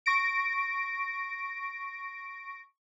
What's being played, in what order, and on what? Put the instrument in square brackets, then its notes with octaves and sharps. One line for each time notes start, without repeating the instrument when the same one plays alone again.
[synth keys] C#6 A#6 D7